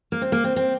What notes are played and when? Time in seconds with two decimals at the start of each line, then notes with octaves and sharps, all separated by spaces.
0.12 A#3
0.22 C4
0.32 A#3
0.44 C4
0.56 C4